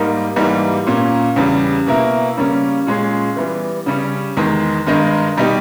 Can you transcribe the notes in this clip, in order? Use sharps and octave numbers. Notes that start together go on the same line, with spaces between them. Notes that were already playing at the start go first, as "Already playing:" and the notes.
Already playing: G#2 G3 A#3 D#4 A#4
G#2 E3 G3 A#3 D#4
A#2 A#3 C#4
E2 C#3 G3
B2 A#3 E4 A#4
C#3 G3 A#3 C#4
A#2 G#3 C#4 G#4
E3 G3 B3
C#3 G3 C#4
E2 D#3 G#3
G2 D#3 G#3 D#4 A#4
B2 G3 B3 D#4 G4